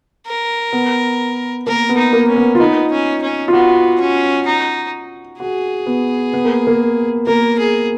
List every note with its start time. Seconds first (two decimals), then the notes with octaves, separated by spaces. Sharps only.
0.26 A#4
0.73 B3
1.67 A#3 A#4
1.89 B3
1.97 D#4
2.13 A#3
2.28 C#4
2.36 B3
2.55 F4
2.59 B3 D#4
2.91 C#4
3.22 C#4
3.48 F4
3.53 B3 F#4
4.00 C#4
4.46 D#4
5.40 F#4 G#4
5.86 B3
6.34 B3
6.45 A#3
6.67 A#3
7.27 A#3 A#4
7.58 G#4